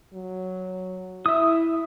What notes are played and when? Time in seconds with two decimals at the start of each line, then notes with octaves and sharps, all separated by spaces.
0.14 F#3
1.26 E4 E5 D#6